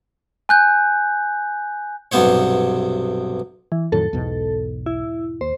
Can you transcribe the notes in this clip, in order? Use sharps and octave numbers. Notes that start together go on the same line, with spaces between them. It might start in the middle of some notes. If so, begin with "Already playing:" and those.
G#5 F#6 G6
B1 G2 C3 B3 C5 C#5
E3
F2 A2 D#3 F#3 A4
B1 E2 G#2 B2
E4
D#2 C5